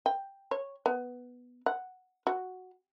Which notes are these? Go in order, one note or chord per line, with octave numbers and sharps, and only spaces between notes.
G5
C#5
B3
F#5
F#4